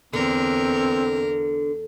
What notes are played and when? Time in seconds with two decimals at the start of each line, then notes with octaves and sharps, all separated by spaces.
0.13 E2 D3 C4 A#4